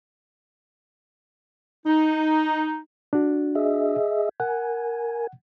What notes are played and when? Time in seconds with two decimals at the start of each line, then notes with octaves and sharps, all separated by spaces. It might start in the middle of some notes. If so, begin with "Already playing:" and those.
1.86 D#4
3.13 D4 F#4
3.55 G#4 D#5 E5
4.40 A#4 F#5 G#5